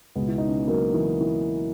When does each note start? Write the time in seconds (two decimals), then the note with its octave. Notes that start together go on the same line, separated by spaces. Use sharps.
0.15 C#2 B2 G#3 B3
0.28 E4
0.38 D#4
0.48 C#4
0.58 B3
0.68 F#3 A#3
0.94 E3
1.20 E3